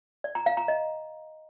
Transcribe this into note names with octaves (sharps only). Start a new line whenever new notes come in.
D5
A#5
F5
A#5
D#5